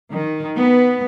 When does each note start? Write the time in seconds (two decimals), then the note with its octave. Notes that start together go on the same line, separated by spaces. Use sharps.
0.11 D#3
0.57 B3